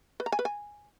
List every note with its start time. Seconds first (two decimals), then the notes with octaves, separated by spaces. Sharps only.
0.20 B4
0.26 A#5
0.32 G#5
0.39 B4
0.45 G#5